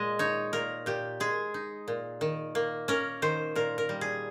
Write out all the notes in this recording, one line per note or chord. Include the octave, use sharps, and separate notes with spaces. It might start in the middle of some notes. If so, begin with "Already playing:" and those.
Already playing: A#2 G#3 D#5
D#4 C#5
A#2 A#4
A#2 G4
G#3 G#4
D#4
A#2
D#3
A#3
C#4 A#4
D#3 C5
A#2 A#4
A#4
G3
G#4